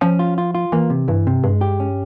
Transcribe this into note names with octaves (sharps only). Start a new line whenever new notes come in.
F3 C#4
F4
F4
F4
E3 A#3
C3
G2 E3
C3
G2 G#3
G4
C#4